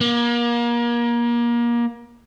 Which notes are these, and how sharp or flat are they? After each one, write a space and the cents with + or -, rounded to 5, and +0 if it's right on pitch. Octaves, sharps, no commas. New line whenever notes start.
A#3 +30